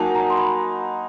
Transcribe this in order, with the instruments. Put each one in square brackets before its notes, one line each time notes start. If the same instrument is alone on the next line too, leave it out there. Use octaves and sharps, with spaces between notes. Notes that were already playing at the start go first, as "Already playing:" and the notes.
Already playing: [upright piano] F#3 A#3 D#4 F#4 [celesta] G#5 A5
[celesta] A#5
C6
B5